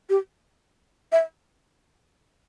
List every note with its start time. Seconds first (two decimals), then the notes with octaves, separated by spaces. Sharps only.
0.10 G4
1.12 E5